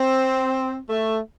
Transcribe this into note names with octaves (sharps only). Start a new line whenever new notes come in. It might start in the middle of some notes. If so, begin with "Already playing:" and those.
Already playing: C4
A3